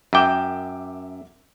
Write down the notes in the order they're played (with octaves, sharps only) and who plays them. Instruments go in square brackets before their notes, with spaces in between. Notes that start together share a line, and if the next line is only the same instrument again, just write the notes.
[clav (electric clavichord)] F#2 G5 [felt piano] E5 D6 E7